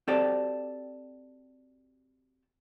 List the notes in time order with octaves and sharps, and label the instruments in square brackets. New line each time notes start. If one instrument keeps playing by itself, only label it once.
[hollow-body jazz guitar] C4 F#4 G4 A4 C5 D5